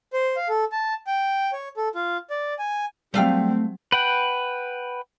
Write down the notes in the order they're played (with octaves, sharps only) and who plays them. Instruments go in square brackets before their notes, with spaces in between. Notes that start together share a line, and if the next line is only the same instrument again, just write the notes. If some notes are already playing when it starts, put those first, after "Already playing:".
[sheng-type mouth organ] C5
F5
A4
A5
G5
C#5
A4
F4
D5
G#5
[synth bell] F#3 G3 [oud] A3 F5 [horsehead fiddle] C4 [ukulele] D5 G5
[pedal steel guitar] B4 F#5 G5